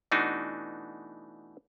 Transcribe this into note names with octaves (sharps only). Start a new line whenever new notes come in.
B2 E3 A3 D4 D#4 F#4